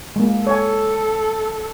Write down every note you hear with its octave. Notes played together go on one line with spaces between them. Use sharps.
G#3 A#3
A4 C#5 G#5